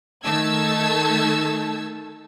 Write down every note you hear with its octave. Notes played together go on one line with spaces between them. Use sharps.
D#3 A3 A5 E6 G#6